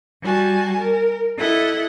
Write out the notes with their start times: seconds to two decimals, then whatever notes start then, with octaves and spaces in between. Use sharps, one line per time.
0.21 G3 F#4 G#5 A5
0.78 A#4
1.37 E4 A4 D#5 F#5